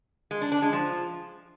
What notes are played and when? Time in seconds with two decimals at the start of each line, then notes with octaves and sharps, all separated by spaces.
0.31 G#3
0.41 D4
0.52 D4
0.62 G#3
0.73 F3